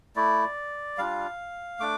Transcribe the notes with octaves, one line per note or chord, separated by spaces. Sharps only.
A3 E4 D5
G3 D4 F4 F5
A3 D4 D6